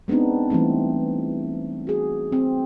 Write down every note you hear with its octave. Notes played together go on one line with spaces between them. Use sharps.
G#3 B3 C4 D4 D#4
E3 G3 A3 C4
F#4 G#4
C4